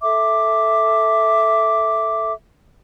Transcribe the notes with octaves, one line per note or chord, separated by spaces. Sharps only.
A4 E5 D6